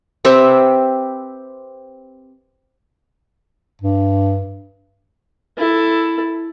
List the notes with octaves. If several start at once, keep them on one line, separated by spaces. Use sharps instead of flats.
C4 G4 B4 E5
G2
E4 A4